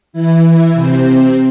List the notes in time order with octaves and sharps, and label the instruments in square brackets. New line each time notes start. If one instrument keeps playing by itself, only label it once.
[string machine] E3 E4
C3 C4